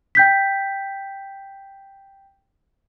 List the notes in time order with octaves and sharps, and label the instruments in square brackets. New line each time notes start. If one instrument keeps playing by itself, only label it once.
[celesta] G5 G6 B6